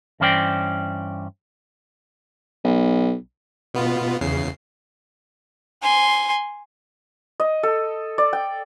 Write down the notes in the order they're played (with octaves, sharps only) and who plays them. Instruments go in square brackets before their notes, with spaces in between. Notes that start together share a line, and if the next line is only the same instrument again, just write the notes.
[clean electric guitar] G2 E3 C#4 C5 D5 G5
[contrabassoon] B1
[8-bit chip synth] B2 B3 F4
E2 C#3 C7
[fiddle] G#5 C6
[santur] D#5
A4
D5
G5